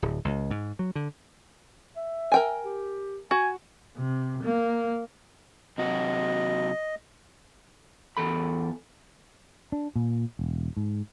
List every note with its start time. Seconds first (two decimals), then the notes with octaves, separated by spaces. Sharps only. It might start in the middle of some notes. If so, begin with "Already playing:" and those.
0.02 D1
0.25 C#2
0.51 G#2
0.79 F#3
0.95 D3
1.96 E5
2.32 A#4 G5 G#5
2.65 G4
3.31 F#4 G#5
3.97 C3
4.44 A#3
5.78 C3 F#3 F#4 D#5
8.17 E2 A4 B5
9.72 D4
9.96 A#2
10.39 E1
10.77 G#2